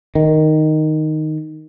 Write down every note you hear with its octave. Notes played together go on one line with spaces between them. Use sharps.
D#3